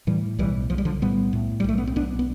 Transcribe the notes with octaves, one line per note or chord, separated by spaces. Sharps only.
A2 E3 G3
B1 E3 G3
B1 F3
G3
D3 F3
A2 G3 B3
A2
G3
B1 A3
B3
C4
B1 B3 D4
B3